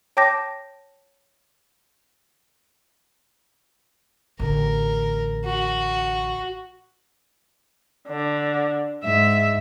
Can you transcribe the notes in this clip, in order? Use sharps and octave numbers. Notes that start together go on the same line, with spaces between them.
C#5 G5 A5 D6 G6 A#6
A1 D3 A#4
F#4
D3
G#2 E5